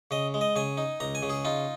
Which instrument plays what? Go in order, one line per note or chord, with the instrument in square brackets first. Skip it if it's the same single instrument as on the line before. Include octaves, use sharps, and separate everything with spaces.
[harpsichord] C#3 D#5
G#3
D#5
C#3 G#5
D#4
C#2 A#5
G#5
C#3
G#4
D#4 F4